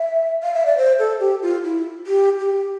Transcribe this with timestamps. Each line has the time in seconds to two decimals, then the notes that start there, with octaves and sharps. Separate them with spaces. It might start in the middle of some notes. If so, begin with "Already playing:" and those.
Already playing: E5
0.43 F5
0.54 E5
0.66 D5
0.77 C5
0.99 A4
1.20 G4
1.42 F4
1.64 E4
2.07 G4
2.39 G4